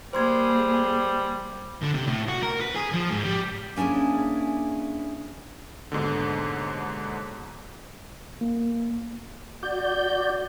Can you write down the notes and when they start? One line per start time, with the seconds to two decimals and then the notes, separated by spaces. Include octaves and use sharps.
0.13 G3 A#3 G#4 C5 C6 G#6
1.82 D3
1.94 C3
2.07 A2
2.29 F#4
2.43 A#4
2.60 B4
2.75 G#4
2.93 F3
3.10 G#2
3.24 G3
3.76 A#3 C#4 D4 E4 G#4
5.92 D#2 G#2 B2 D3
8.41 A#3
9.63 F#4 D5 G6